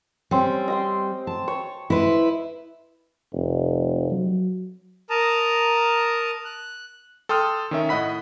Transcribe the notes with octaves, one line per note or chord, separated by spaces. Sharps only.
G3 C4 C#4
D#5 G5 C6
A5
C#5
E4 B4 C5 D#5
F1
F#3
A#4 A5 A#5 D#6
F#6
A4 G5 C6 D#6 F6
D#3 C#4 E5
A2 D#5 F#5 B5 B6